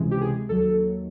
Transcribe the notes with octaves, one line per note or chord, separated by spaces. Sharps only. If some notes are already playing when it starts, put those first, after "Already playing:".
Already playing: C#2 C3 E3 G#3
G4
G#4
D#2 D#3 F#3 A4